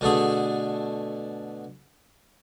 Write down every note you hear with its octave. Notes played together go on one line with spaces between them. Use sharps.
B2 D3 A3 G#4